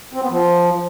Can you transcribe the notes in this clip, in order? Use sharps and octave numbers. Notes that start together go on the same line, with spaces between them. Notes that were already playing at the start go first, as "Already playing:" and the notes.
C4
B3
F3